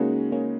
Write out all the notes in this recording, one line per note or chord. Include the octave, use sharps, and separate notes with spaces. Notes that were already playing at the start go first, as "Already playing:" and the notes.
Already playing: C#3 G#3 A#3 C#4 D#4 F#4
A#3 C#4